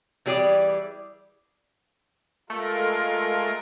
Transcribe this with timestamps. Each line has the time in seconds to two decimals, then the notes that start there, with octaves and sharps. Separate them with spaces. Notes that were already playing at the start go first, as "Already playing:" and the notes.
0.26 E3 G3 G#4 D5
2.50 G#3 A3 F4 A#4